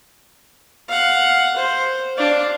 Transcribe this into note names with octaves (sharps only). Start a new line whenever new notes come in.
F5 F#5
C5
D4 F5